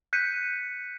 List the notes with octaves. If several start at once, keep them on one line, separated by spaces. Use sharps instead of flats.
F#6 G6 B6 C#7 D#7